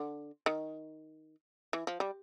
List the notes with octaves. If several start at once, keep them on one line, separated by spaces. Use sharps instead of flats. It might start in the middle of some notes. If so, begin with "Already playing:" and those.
Already playing: D3
D#3
E3
F3
G3